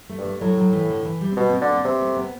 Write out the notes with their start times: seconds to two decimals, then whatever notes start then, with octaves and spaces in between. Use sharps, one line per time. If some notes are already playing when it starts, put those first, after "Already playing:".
0.09 A3
0.18 G2
0.25 A3
0.41 A2 F#3
0.57 F#3
0.73 E3
0.90 D3
1.05 E3
1.21 G3
1.32 C4
1.37 B2 B3
1.49 C4
1.61 D3 B3
1.73 C4
1.84 C3 B3
2.01 A3
2.17 B3